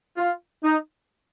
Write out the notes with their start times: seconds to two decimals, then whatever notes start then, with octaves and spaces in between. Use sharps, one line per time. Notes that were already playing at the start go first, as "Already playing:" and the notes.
0.18 F4
0.63 D#4